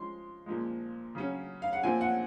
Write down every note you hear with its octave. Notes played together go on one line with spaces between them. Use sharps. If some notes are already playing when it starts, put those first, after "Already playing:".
Already playing: F3 G#3 C#4 C6
A#2 F3 G#3
C#3 F#3 C#4
F5
F#5
A#2 F3 C4 G#5
F#5